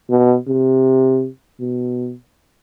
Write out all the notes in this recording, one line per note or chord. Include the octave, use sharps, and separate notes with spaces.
B2
C3
B2